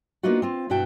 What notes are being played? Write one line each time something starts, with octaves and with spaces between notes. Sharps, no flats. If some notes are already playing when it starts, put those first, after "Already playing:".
A#3 B3 D4 D#4 F4 F#4
C4 F4
G2 B2 E4 F#4 G5 A5